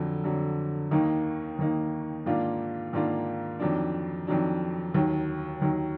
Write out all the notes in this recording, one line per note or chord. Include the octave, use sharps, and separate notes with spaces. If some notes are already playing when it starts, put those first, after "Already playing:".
Already playing: F2 D3 F#3
F2 D3 F#3
D#2 D#3 A#3 D#4
D#2 D#3 A#3 D#4
G#2 D#3 A#3 D4 F4
G#2 D#3 A#3 D4 F4
F2 D#3 F#3 D4
F2 D#3 F#3 D4
D#2 D#3 F#3
D#2 D#3 F#3